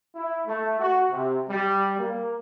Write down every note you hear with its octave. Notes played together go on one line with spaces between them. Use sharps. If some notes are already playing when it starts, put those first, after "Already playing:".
E4
A3
F#4
C3
G3
A#3